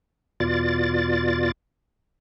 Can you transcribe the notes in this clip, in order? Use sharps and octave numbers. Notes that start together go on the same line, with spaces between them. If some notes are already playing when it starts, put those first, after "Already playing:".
E2 B2 F4 D5 A6